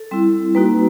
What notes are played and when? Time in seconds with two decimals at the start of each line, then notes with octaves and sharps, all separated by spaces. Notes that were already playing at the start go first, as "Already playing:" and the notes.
Already playing: A4
0.11 G3 C4 E4
0.55 G3 A#3 D#4 F#4 B4